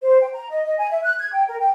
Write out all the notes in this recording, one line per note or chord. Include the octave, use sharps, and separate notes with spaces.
C5
G5
A#5
D#5
D#5
G#5
E5
F#6
G#6
G5
A#4
G5